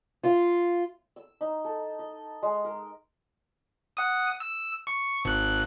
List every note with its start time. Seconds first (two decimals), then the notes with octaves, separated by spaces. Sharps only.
0.23 F4
1.16 E6
1.41 D#4
1.64 A4
1.99 D#5
2.43 G#3
2.65 A#4
3.97 F#5 D#6
4.40 E6
4.87 C#6
5.25 G#1 F#6